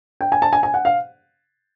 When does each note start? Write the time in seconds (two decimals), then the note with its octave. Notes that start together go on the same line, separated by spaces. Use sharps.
0.21 G5
0.32 G#5
0.42 A5
0.53 G#5
0.63 G#5
0.74 F#5
0.85 F5